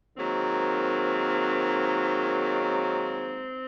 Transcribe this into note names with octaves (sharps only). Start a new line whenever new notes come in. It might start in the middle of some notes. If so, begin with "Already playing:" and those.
G#2 D#3 F#3 A#3 C4
C4